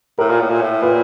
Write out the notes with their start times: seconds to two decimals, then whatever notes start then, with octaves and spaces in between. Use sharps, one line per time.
0.19 A2 A#4
0.29 A#2
0.40 A2
0.50 A#2
0.61 A2
0.82 A#2 B4